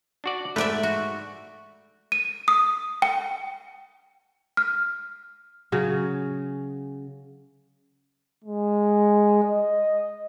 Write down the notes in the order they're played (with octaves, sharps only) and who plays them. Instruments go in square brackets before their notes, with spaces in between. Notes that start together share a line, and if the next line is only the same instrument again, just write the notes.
[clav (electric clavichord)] D4 F#4 D5
[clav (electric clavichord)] G#2 A3 [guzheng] B4 D5 E5
[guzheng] F#4
[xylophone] D#7
D#6
G5
F6
[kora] C#3 F#3 G#4
[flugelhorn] G#3
D#5